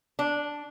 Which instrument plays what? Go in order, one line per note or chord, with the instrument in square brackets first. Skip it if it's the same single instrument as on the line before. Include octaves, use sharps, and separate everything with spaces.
[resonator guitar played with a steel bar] D4